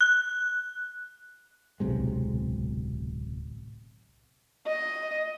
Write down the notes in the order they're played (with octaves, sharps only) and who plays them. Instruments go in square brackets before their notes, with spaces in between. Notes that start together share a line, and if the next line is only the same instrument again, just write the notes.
[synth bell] F#6
[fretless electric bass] D1 B1 C3 G#3
[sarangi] D#5